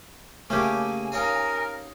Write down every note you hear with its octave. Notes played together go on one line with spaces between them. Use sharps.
C#3 A3 A#3 C#4 G4 G#5
D#4 A#4 C#5 F5